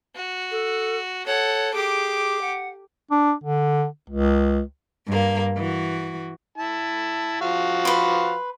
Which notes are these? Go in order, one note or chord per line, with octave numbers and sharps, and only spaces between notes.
F#4
A4
A4 C#5 F#5
G4 G#4 D6
F#5
D4
D3
C#2
G2 A#3
E3 F#4
E4 A5
F3 F#4 F5
B4 C6